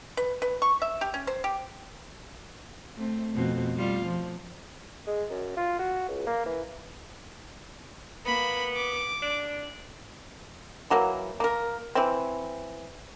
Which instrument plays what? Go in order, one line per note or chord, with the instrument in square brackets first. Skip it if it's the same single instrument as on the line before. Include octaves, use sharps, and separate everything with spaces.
[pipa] B4
B4
C#6
E5
G4
C#4
C5
G4
[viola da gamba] A3 C4
F2 B2 C4
G3 F4
F3
[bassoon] G#3
F#2
F4
F#4
C#2
A#3
E3
[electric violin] A#3 B5 [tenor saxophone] B3
[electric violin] D6
[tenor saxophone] D4
[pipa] E3 F#3 A#3
A#3 A#4
E3 C4